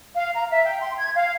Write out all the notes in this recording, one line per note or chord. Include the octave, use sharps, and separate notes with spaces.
F5
A#5
E5
G5
C6
G#6
F5